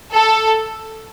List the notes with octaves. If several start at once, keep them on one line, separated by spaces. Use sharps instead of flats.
A4